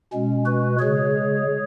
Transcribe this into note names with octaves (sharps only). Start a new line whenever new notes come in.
B2 G#3 C#4
F#4 B4
C#3 G#3 G#4 C#5